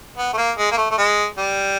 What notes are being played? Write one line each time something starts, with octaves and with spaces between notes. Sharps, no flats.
B3
A3
A#3
G#3
A#3
A3
A3
G#3
G3